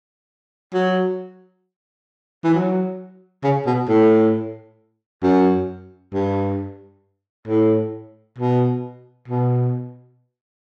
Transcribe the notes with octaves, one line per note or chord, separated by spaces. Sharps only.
F#3
E3
F#3
C#3
B2
A2
F#2
G2
A2
B2
B2